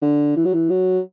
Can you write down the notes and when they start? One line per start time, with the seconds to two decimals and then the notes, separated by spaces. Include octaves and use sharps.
0.02 D3
0.36 E3
0.45 F#3
0.53 E3
0.70 F#3